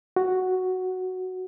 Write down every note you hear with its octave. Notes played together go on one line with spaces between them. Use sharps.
F#4